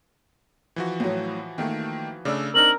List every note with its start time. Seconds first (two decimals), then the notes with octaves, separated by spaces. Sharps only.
0.76 E3 F3 F#4
1.00 A2 F#3
1.58 D#3 A3 A#3
2.25 C#3 A3 D4 D5 E6
2.55 C4 D4 D#4 A#4 F#7